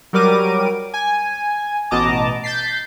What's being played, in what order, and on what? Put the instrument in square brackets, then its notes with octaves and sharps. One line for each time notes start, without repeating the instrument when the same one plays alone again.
[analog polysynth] F#3 G3 A#4 D6 D#7
G#5
A1 B2 D#5 A5 A#5 D6
G6 A6 B6 C7